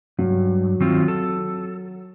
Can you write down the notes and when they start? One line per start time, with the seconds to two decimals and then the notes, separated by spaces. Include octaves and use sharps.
0.18 G2 F#3
0.80 D#3 C4 F4
1.08 A4